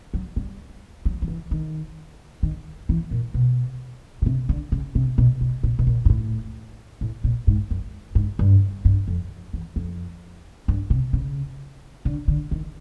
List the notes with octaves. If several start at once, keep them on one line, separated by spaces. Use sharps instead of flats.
F#3
G3
F#3
F3
E3
D#3
D#3
E3
A#2
B2
B2
C3
D3
C#3
C3
B2
B2
A#2
B2
A#2
G#2
A2
A2
A#2
G#2
F#2
G#2
G2
G2
F2
E2
F2
G2
C3
C#3
D3
D3
D#3